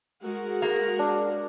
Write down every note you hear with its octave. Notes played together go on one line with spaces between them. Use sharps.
G#3 F#4 A#4
A#3
D4